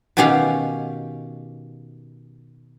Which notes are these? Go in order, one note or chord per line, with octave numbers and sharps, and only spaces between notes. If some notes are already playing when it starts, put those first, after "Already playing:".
B2 D#3 C#4 G4 F5 F#5